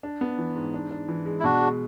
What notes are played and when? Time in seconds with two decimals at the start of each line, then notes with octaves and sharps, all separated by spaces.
0.03 D4
0.21 B3
0.38 E3
0.55 G#2
0.74 D4
0.91 D4
1.08 E3
1.26 G#3
1.40 E4
1.44 B2 D4 F#4
1.61 G#3